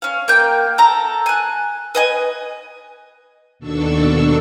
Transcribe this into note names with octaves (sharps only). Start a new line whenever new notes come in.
C#4 F5
A#3 G5
A4 A#5
G#5 F#6
B4 D#5 G#5
D#2 B2 D4 A4 C#6 E6